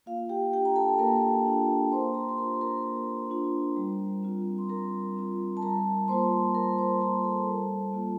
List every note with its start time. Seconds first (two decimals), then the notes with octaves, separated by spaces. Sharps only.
0.06 A#3 F4 F5
0.29 G4 G5
0.52 D4 F4 G4 G5
0.65 A#5
0.76 A4 A5
0.99 A#3 A#4 A#5
1.46 D4 F4
1.92 A#3 C5 C6
2.14 A#4 A#5
2.29 C6
2.38 D4 F4 A#4 A#5
2.61 A#4 A#5
2.85 A#3
3.30 D4 F4
3.76 G3
4.23 C4 F4
4.58 C6
4.69 G3 A#4 A#5
5.16 C4 F4
5.57 A5
5.62 G3 A#4 A#5
6.08 A#3 F4 C5 C6
6.54 G3 A#4 A#5
6.78 C5 C6
7.01 A#3 F4 A#4 A#5
7.24 A4 A5
7.47 G3
7.93 A#3 F4